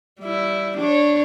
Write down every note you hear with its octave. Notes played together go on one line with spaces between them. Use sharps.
G3 E4
D4 C#5